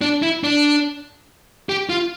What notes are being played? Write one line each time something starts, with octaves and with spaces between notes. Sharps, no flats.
D4
E4
D4
G4
F4